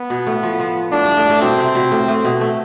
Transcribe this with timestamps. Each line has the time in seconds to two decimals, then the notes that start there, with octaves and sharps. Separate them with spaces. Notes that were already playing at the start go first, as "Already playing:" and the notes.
Already playing: B3
0.10 B2
0.27 A2
0.43 F3
0.60 F3
0.92 A2 D4
1.05 G2
1.17 A2
1.30 A2
1.41 B2 C4
1.58 C3
1.75 B2
1.91 A2
2.08 A2
2.25 B2
2.41 A3